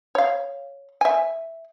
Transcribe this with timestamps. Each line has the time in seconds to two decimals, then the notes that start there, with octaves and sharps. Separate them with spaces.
0.15 C#5 F5
1.01 E5 G#5